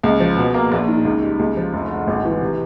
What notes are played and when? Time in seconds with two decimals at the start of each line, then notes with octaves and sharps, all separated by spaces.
0.03 C#2
0.20 F3
0.36 B2
0.54 A#3
0.72 A#1
0.88 D#3
1.05 C#2
1.22 G3
1.39 C#2
1.57 F3
1.74 F1
1.91 D3
2.07 G#1
2.25 E3
2.41 C3